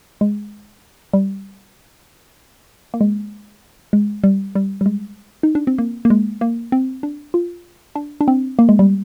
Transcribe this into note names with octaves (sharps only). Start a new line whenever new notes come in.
G#3
G3
A#3
G#3
G#3
G3
G3
G3
G#3
D#4
D4
C4
A#3
A#3
G#3
A#3
C4
D4
F4
D4
D4
C4
A#3
G#3
G3